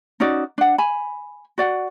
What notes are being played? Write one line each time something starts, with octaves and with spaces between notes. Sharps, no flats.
C#4 D#4 F#4 D5
D4 F#5
G#5 B5
F#4 D5 F#5